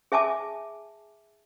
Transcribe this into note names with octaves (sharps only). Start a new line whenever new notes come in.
G#4 E5 G#5 A5 D6